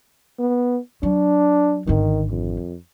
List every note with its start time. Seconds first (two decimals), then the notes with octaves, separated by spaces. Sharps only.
0.39 B3
1.03 F#3 D4
1.87 G#1 D3 D#3
2.30 F2